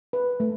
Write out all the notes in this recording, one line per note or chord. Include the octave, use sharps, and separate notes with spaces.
B4
A3